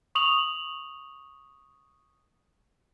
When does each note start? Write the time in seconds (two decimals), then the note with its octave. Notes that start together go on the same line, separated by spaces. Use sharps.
0.15 C#6 D#6 F7 F#7